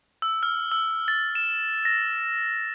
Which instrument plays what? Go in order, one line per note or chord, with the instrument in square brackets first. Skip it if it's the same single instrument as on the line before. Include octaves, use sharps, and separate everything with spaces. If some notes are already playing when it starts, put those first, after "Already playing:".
[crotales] E6
F6
E6
A6
E7
A#6